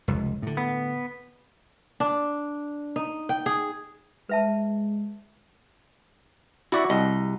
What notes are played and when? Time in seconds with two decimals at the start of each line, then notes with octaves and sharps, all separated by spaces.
0.08 F1 C#2
0.42 A2 D3
0.57 B3
2.00 D4
2.96 D#4
3.29 G5
3.46 G#4
4.29 G#3 B4 E5 A5
6.72 E4 F#4 D5 E5 F#5
6.90 C2 D#5